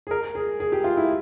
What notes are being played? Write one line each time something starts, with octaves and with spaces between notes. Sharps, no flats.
G#4
A#4
G#4
G#4
G4
F4
E4